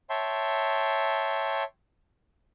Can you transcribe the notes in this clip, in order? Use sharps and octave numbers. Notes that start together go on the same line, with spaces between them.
C#5 E5 G5 A5 C6